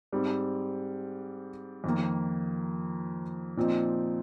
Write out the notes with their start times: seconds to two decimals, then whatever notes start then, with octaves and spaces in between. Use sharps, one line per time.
0.13 G#2 G3 C4
1.84 F2 D#3 A#3
3.57 A#2 F3 C4 D#4